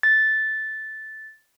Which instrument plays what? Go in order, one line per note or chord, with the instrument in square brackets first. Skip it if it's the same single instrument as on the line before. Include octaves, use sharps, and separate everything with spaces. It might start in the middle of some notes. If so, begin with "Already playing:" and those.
[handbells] A6